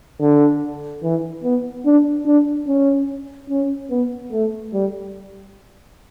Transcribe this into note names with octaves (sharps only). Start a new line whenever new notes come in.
D3
E3
B3
D4
D4
C#4
C#4
B3
A3
G3